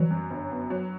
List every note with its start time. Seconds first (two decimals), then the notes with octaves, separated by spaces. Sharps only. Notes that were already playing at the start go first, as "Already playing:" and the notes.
Already playing: E3 F#3 G3
0.10 F#2
0.30 G1
0.51 B3
0.70 F#3